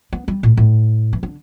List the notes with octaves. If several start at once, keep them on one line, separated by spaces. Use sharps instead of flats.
B3
G3
A2
A2
E3
D3